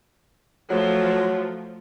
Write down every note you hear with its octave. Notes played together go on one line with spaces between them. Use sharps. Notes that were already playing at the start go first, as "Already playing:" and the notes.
F3 F#3 A3